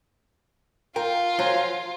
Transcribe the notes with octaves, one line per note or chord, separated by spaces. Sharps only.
F4 A#4 G5
F#2 F3 F#3